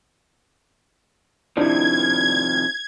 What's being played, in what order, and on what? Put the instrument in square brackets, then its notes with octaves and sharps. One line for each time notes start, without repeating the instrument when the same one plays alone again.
[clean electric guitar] C3 D#3 F3 [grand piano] D4 E4 [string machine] G#6